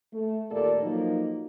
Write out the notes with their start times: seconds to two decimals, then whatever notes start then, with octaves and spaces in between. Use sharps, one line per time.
0.13 A3
0.50 D#2 A#2 A#3 G4 A4 D5
0.82 F3 F#3 A#3 D#4